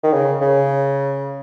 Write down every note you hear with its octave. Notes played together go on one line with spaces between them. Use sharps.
D#3
C#3
C#3